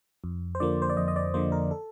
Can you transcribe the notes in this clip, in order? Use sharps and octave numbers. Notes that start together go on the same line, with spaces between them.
F2
C5
D3 F3 A#3 D5
C5
D5
F2 D#5
D#5
D5
D3 F3 A#3 C5
A#4
A4